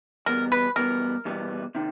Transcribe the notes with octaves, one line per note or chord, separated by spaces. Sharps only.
E2 B2 G3 B3 A#4
B4
E2 B2 G3 B3 A#4
E2 B2 G3 B3
C3 D#3